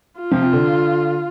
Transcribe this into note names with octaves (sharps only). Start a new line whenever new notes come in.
F4
C3 F3
C3
D3